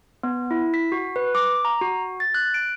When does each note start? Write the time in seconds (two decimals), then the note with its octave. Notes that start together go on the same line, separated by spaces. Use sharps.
0.23 B3
0.51 E4
0.74 B6
0.92 F#4
1.16 B4
1.35 D6
1.65 A#5
1.81 F#4
2.20 A6
2.34 F#6
2.54 D7